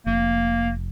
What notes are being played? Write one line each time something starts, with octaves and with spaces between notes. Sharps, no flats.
F1 A#3